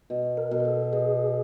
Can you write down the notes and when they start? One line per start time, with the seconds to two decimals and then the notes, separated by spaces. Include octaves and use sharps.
0.10 B2
0.37 A#4
0.51 B2
0.60 A#4
0.65 A4
0.93 B2 G#4